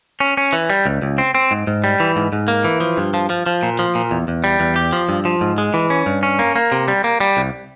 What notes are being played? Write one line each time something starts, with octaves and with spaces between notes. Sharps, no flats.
C#4
C#4
E3
G3
C#2
C#2
C4
C4
G#2
G#2
G3
E3
G#2
G#2
A#3
E3
F3
G2
F3
F3
F3
A#2
F3
A#2
E2
E2
G3
E2
G4
F3
G2
F3
G#2
G#3
E3
C#4
G2
C#4
A#3
A#3
C3
G3
A#3
G3
C2